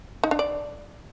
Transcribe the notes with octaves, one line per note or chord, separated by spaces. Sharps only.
D#4
D4
D5